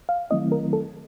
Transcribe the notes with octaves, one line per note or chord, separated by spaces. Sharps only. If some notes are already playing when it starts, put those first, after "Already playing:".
F5
D#3 F#3 A3 C4 E4 D#5
A#4
A4